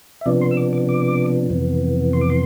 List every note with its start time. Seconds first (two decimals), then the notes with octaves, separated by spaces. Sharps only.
0.21 E5
0.26 C3 F3 B3 D4 D5
0.41 C6
0.51 E6
0.57 D6
0.73 D6
0.89 D6
1.50 F2 C3 E3 B3
2.13 C6
2.21 D6
2.30 C6